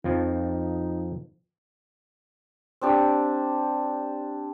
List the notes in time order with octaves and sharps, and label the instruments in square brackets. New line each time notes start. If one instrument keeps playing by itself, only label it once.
[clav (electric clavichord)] F2 F3 [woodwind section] D#4
[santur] C4 D4 G4